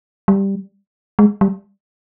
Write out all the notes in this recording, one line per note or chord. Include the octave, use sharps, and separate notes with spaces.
G3
G#3
G3